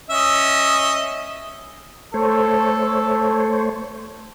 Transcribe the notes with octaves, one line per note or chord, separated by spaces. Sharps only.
C#4 D#5 E5
A3 A4 C5 C#5